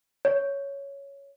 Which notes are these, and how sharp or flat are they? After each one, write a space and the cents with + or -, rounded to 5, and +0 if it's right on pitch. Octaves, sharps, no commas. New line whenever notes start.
C#5 +5